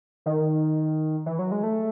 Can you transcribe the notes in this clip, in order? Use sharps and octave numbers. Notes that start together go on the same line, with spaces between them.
D#3
E3
F#3
G#3
A3